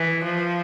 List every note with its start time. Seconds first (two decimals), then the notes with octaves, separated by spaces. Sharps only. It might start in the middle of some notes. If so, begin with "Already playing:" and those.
Already playing: E3
0.24 F3